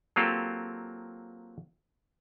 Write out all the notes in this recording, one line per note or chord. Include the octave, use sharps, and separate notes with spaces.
F#3 A#3 C4 F4 G4 A4